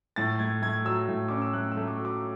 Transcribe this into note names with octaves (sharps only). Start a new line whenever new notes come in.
A2 A6
A3 G#6
A3 G#6
F#3 E6
A2
C#4 D6
E6
A3 F#6
E6
A3
D6
F#3
D6